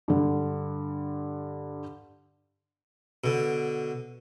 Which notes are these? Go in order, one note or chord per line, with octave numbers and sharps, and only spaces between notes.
G2 D3
B2 D3